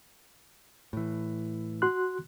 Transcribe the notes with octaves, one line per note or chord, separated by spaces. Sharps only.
A2 E3
F#4 C6 F#6